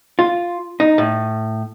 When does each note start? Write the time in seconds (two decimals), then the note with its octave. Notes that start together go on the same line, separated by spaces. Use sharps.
0.19 F4
0.80 D#4
0.98 A2